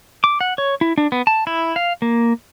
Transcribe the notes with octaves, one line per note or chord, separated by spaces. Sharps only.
D6
F#5
C#5
E4
D4
B3
A5
E4
F5
A#3